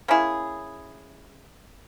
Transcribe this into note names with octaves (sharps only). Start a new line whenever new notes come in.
A#3 C#4 E4 G#4